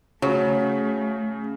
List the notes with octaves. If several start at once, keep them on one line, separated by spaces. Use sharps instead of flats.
C#3 F#3 A3